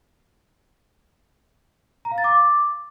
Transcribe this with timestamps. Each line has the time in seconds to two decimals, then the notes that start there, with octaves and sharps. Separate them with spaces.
2.05 A#5
2.11 F5
2.18 A6
2.24 D6